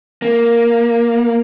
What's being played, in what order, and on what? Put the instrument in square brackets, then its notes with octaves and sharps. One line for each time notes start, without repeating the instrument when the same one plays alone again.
[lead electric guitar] A#3